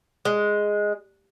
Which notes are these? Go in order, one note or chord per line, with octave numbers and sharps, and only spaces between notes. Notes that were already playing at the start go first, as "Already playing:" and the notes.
G#3